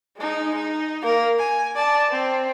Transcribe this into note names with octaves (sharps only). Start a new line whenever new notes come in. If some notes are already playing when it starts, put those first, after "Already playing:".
G#3 D#4
D#4
A#3 A#4
G#5
D5 A5
C4